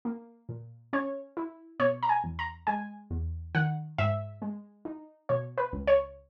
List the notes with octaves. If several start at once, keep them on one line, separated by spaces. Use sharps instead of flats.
A#3
A#2
C#4 C#5
E4
B2 C#5
A#5
G#5
E2
A#5
G#3 G#5
E2
D#3 F#5
G#2 E5
G#3
D#4
B2 C#5
B4
C#2
C#5